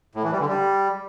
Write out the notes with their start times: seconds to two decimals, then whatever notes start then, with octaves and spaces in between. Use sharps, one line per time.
0.15 A2
0.23 E3
0.32 G3
0.40 D3
0.48 G3